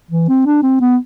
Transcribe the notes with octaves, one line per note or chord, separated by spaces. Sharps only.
E3
C4
D4
C4
B3